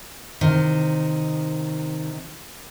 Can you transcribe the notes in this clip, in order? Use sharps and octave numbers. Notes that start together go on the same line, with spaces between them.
C3 D#3